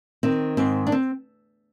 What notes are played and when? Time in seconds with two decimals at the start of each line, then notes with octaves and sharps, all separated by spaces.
0.23 D#3 C4
0.57 G#2 C4
0.87 D4
0.92 C4